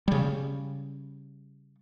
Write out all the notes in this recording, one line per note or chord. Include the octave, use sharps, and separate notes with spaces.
C#3 G3